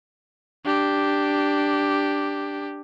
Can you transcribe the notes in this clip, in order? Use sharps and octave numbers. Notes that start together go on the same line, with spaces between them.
D4 G4